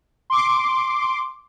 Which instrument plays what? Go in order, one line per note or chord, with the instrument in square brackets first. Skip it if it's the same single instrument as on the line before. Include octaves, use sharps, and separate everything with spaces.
[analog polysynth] C6 D6